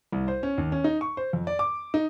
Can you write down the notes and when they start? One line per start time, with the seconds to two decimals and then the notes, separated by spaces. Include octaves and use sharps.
0.12 C2
0.28 C5
0.43 C#4
0.58 D#2
0.72 C#4
0.84 D#4
1.01 C#6
1.17 C5
1.33 F2
1.47 D5
1.59 D6
1.94 D#4